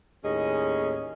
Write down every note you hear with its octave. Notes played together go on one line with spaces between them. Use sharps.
D#2 A2 C#4 G#4 D#5